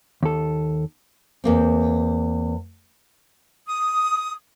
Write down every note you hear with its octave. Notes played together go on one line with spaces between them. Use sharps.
D#2 A4
E2 A#3 C4
D#6